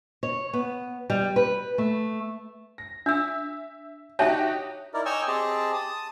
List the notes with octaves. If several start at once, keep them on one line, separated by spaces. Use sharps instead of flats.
C#5
B3
G3
B4
A3
A#6
D4 E5 E6
D#4 F#4 G4 C#5 E5 A5
D#4 E4 A#4 D5
C#5 D#5 G5 G#5 C#6 E6
C4 G4 G#4 D#5 A5
A5 D#6